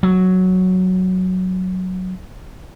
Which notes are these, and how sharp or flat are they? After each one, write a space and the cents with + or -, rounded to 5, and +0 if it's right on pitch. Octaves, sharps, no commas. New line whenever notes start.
F#3 +0